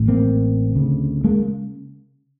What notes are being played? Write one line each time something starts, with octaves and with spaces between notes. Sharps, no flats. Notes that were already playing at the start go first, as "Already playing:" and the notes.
Already playing: A1 A2
A#3 C4
D2 C#3
G#3 A#3